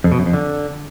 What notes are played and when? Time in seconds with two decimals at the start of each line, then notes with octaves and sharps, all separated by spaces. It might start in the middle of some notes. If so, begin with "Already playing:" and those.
0.04 F2
0.12 B2
0.19 F#2
0.26 F2
0.33 D3